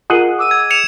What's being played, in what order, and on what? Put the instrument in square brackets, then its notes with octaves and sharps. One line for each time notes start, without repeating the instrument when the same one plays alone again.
[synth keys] F4 A#4 [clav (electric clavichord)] G#4 D#5 F#5
[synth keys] D6 E6 D#7
[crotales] G#6
C#7 E7 F7